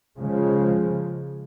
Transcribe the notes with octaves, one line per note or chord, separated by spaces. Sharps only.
C#3 F3 G#3